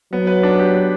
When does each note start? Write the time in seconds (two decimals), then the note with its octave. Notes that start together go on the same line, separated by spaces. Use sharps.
0.13 F#3 B3
0.27 B4
0.43 D4
0.59 G4
0.74 B3